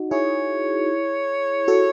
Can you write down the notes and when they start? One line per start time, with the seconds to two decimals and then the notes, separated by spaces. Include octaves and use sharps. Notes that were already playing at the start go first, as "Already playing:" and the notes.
Already playing: D#4 F#4
0.11 E4 G#4 C#5
1.68 F#4 A4